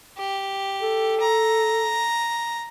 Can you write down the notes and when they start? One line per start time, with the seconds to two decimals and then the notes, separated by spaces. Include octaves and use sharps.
0.18 G4
0.82 A4
1.20 A#5